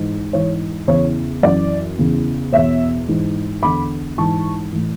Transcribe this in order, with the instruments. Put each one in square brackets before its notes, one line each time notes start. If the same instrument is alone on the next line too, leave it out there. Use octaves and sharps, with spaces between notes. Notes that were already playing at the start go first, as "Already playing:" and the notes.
Already playing: [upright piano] G#2 E3
G#2 E3 C#5
E2 C#3 E3 C#5
F#2 E3 D5
E2 C#3 E3
E2 B2 C#5 E5
G#2 E3
E2 D3 B5 D6
G#2 E3 A5 C#6
A2 E3